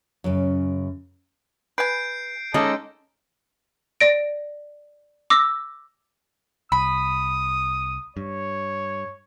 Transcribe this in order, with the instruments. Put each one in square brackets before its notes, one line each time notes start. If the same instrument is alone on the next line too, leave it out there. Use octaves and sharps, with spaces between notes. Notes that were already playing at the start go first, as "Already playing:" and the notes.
[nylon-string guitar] F#2 C#3
[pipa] B4 G#5 [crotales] G6 C7 D7
[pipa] C#3 A#3 [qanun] G#3 C#4 D#4 [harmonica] A4 D#5
[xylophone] D5 A#6 D7
D6 E6 A#6
[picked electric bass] C2 [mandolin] B5 [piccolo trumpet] D#6
[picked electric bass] G2 [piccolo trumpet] C#5